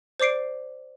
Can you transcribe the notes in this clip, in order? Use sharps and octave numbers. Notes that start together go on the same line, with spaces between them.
C5 D5 D6 C7 D7